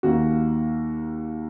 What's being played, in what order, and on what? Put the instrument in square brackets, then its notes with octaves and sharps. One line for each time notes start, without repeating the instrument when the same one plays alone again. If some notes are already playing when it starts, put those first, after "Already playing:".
[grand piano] D#2 D#3 A#3 F#4